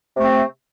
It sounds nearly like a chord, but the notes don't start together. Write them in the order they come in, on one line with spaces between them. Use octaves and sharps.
C3 A3 C4